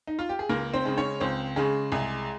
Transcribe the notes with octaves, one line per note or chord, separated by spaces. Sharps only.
D#4
F4
G4
G#4
C#2 A#3 A#4
C4 C5
C#3 G#3
C#4 C#5
C#2 C4 C5
C#3 G#3 G#4
C2 G#3 G#4